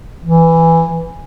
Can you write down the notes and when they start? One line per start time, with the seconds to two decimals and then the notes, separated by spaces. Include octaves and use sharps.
0.24 E3